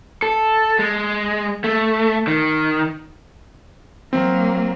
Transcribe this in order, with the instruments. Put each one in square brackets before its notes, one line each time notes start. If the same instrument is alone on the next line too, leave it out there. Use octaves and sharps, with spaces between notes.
[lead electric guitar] A4
G#3
A3
D#3
[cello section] F#3 A#3 [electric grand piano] C4